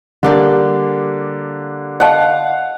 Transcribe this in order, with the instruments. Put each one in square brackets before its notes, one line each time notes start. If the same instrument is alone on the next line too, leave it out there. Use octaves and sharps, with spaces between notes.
[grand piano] D3 A#3 D4 [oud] G3 G4 D5
[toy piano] D#5 A5 [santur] F5 F#5